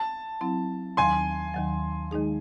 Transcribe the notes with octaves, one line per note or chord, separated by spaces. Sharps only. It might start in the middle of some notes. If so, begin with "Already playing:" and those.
Already playing: A5
F#3 C4 E4
D#2 D#3 F#3 G#5 C6
D#2 D#3 F#3
D#3 G#3 D#4 G#4